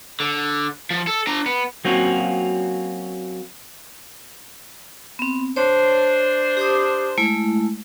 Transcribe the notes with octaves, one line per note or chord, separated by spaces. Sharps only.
D3
F3
A4
D4 A#5
B3
F#3 A#3 C4 C#4 F4 F#4
B3 C4
D4 C5 C#5
G4 D6 D#6
G#3 A3 E4